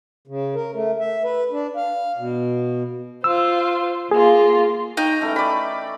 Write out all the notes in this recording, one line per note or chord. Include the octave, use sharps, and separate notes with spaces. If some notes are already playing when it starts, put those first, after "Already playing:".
C#3
A#4
A3
E5
B4
D4
F5
B2
F4 C5 E6
A#3 F4 G#4
D#4 G5 C#6
E3 A3 C#4
D5 B5